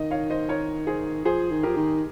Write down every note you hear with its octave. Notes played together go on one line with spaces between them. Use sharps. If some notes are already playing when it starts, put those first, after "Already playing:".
Already playing: D#3 D#5
C#5 F5
C5 D#5
A#4 C#5
G#4 C5
F3 G#4 C5
D#3
F3 G4 A#4
D#3